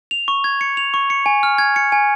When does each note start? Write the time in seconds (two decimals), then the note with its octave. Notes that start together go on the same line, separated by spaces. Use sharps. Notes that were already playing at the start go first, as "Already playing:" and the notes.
0.11 F7
0.28 C#6
0.44 G#6
0.61 C#7
0.77 F7
0.94 C#6
1.10 C#7
1.26 G#5
1.43 F6
1.58 G#6
1.76 C#7
1.92 G#5